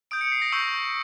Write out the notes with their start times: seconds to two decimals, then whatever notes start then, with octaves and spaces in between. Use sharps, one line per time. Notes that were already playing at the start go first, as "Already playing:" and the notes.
0.11 D#6 G6 D7
0.21 C#7
0.32 C7
0.42 A#6
0.52 C#6 E6 G6 A#6